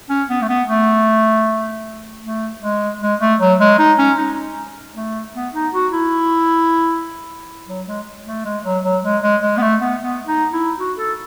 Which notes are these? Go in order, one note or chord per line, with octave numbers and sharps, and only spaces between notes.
C#4
B3
A3
B3
A3
A3
G#3
G#3
A3
F#3
G#3
D#4
C#4
D#4
A3
B3
D#4
F#4
E4
F#3
G#3
A3
G#3
F#3
F#3
G#3
G#3
G#3
B3
A3
B3
B3
D#4
E4
F#4
A4